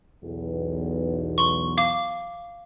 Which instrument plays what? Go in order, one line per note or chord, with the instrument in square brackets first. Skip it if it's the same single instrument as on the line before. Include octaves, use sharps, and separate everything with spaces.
[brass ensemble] B1 E2
[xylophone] C6 C#6
F5 D6